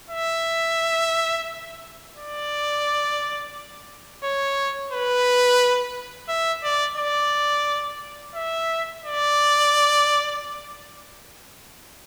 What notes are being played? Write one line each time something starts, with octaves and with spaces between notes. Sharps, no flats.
E5
D5
C#5
B4
E5
D5
D5
E5
D5